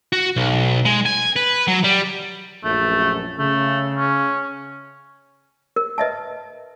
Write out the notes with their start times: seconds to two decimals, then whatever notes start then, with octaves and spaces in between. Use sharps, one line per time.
0.13 F#4
0.36 B1
0.85 G#3
1.06 G#5
1.36 B4
1.68 F#3
1.84 G3
2.64 A#1 F#2 A3
3.39 C#3 A3
3.96 C#4
5.76 A#4
5.98 B4 D#5 E5 A5